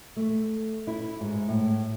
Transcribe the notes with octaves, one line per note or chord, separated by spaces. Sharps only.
A3
E4
G#2
A2